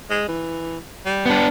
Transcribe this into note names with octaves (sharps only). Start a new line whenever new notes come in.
G#3
E3
G3
B3 D4